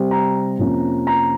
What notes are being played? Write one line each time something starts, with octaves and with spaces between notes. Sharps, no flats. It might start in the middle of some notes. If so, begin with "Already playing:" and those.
Already playing: C3 G3 C4
A#5
F2 C3 F3 A#3 C#4
A#5